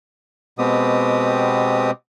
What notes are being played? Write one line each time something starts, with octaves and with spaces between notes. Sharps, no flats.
B2 G#3 B3 C4 G4 D#6